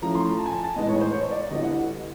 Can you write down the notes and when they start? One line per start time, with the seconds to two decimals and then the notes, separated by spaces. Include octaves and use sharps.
0.02 F3 A3 C#4 E4 A#5
0.15 C6
0.27 A#5
0.39 A5
0.46 G#5
0.52 A5
0.64 A5
0.76 A2 E3 G#3 B3 D#4 D#5
0.89 C#5
1.01 C5
1.13 C#5
1.31 D5
1.50 D3 G3 B3 E4 D#5
1.63 F#5